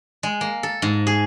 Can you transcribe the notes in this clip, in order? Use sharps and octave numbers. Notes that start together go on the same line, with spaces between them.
G#3
A#3
A4
G#2
G#4